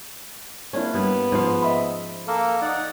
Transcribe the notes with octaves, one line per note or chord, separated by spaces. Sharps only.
A#3 C#4 D4 E4
G2 B3
G#2 F3 F5
D#5 E5 B5
A#3 A4 A#4
D#4 D5 F#5